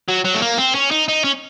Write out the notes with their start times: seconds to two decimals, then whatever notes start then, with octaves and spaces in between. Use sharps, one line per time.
0.08 F#3
0.25 F#3
0.34 A3
0.42 A#3
0.58 C4
0.75 C#4
0.91 D#4
1.08 D#4
1.24 C#4